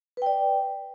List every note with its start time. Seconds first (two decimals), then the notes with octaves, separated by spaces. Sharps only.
0.17 B4
0.22 G5
0.26 D5